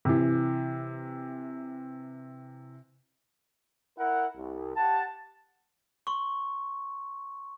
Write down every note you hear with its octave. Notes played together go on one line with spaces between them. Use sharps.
C3 E3
E4 A#4 F#5
C2
G4 F#5 A5
C6 C#6